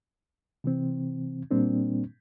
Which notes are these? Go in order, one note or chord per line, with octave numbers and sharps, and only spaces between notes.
C3 E3 C4
A#2 G3 A#3 C4 D4